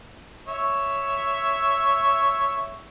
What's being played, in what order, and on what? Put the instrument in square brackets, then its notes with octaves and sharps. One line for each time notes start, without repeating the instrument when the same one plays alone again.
[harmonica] C#5 E5